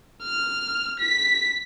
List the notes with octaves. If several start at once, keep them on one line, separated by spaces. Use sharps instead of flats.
F6
B6